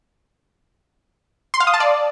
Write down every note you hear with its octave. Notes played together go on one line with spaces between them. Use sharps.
C6
F5
D#6
A5
D5